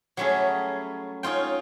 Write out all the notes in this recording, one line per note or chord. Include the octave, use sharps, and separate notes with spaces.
F#3 G3 A3 C#4 E4 G#4
C#4 D#4 F4 G5